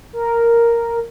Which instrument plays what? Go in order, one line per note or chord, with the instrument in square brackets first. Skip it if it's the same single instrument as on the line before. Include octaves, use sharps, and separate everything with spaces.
[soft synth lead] A#4